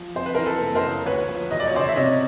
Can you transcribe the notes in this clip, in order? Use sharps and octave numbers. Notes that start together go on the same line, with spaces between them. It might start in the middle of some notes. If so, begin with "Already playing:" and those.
Already playing: F3
F2 C5
B4
E3 A#4 C5
A4 B4
F#1
A#4 C5
C#3
D2 B4 C#5
F3
E1 D#5
D5
C#5
C#3 C5 D5
E5
C3 C#5 D#5